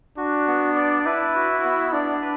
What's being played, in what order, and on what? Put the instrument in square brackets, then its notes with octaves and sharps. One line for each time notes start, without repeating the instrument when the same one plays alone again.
[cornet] D4 [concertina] F#4
[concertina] B3
D5
[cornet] E4 [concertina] B4
[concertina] F#4
B3
[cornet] D4 [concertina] D5
[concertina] B4